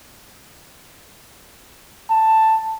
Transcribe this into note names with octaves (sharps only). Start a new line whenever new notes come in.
A5